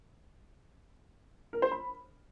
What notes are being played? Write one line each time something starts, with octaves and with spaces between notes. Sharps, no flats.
A#4
C5
B5